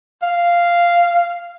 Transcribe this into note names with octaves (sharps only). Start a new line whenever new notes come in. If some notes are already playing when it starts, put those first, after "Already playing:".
F5